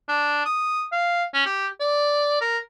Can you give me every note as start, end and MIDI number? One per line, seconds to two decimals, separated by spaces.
0.08 0.41 62
0.45 0.85 87
0.92 1.24 77
1.34 1.44 61
1.46 1.66 67
1.80 2.38 74
2.41 2.58 70